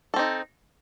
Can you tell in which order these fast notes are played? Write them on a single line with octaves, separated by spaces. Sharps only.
A4 C4 D#4